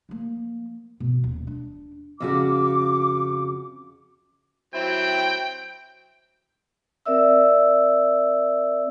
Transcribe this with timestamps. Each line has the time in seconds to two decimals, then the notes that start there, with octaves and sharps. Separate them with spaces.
0.09 F3 A#3
1.00 B2
1.24 D#1
1.47 D4
2.20 F2 C#3 F#4 D6
4.74 F#3 C4 E4 G5
7.06 C4 A#4 D5 E5 E6